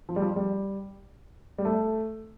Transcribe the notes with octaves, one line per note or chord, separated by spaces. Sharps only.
F3
G3
F3
G3
G3
A3